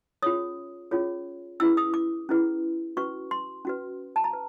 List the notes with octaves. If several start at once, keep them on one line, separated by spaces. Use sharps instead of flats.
C#4 F4 G#4 C#5 D#6
C#4 F4 G#4 C#5
C#4 E4 G#4 B4 E6
D#6
D6
C#4 E4 G#4 B4
C#4 F#4 B4 C#6
C6
C#4 F#4 B4
A5
A#5
B4